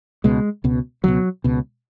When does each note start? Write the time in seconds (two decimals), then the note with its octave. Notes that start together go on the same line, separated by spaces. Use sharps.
0.24 C#2 B2 G#3
0.64 C#2 B2
1.04 C#2 B2 F#3
1.44 C#2 B2